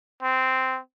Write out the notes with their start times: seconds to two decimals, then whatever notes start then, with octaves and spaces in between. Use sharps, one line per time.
0.23 C4